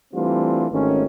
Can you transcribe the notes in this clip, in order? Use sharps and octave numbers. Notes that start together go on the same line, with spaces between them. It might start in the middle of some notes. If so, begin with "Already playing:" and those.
E3 G3 A3 C4 D4 F4
G#1 D#3 A3 C#4